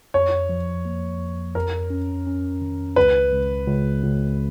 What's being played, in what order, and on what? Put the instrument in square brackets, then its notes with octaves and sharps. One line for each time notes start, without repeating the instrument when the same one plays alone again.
[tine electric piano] F2 [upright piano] C#5
[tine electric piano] F3
A#3
F2
[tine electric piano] F2 [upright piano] A#4
[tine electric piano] C#4
C#4
D#3
[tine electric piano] C#2 [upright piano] B4
[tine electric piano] C#2
C#2
C#2